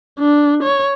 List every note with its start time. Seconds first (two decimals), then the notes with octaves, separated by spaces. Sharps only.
0.19 D4
0.63 C#5